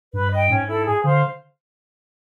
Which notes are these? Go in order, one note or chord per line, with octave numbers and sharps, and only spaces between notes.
G2 B4
D#5 G5
G#2 C#4
E4 A4
G#4
D3 C5 F5